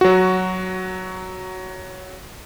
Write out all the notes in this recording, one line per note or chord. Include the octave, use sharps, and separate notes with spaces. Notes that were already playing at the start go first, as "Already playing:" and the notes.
F#3 F#4